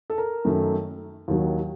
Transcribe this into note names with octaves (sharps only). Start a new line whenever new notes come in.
A4
A#4
F#2 D#3 A3
D#2 D#3 F#3